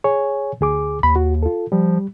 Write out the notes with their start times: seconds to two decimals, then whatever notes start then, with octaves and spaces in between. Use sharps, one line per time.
0.04 G#4 C#5 G#5
0.61 D2 G#4 D6
1.03 D#2 B5
1.16 F#4
1.43 F4 A4
1.72 F3 G3